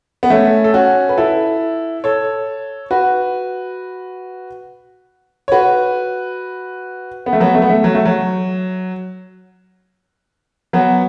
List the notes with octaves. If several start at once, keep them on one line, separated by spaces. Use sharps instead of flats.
B3
A3 C#4
A4
C#4 F#4
B4
E4 A4
A4 C#5
F#4 B4
C#5
F#4 B4
B3
A3
F#3 B3
A3
B3
A3
F#3
A3
F#3
F#3 B3